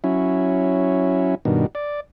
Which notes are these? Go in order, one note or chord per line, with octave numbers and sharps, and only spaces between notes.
F#3 C#4 E4
G2 B2 D#3
D5